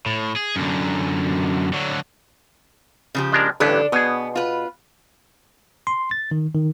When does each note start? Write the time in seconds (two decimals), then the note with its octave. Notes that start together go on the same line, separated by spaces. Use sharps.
0.06 A2
0.36 G#4
0.56 F#2 D3
1.73 D3 F#3
3.15 C#3 F3 G4
3.32 G#3 D4 A#4
3.60 A1 G2 D3 D4 A4 B4
3.92 B2 B3 G#4
4.35 F4 B4
5.87 C6
6.11 A6
6.31 D#3
6.55 D#3